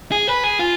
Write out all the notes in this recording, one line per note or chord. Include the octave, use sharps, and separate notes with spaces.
G#4
B4
G#4
F4